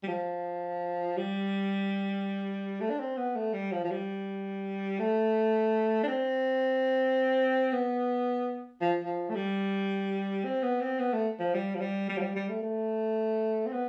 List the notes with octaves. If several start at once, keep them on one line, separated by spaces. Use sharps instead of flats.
G3
F3
G3
A3
D4
C4
B3
A3
G3
F3
F3
G3
A3
D4
C4
B3
F3
F3
A3
G3
C4
B3
C4
B3
A3
F3
G3
F3
G3
G3
F3
G3
G3
A3
A3
C4
B3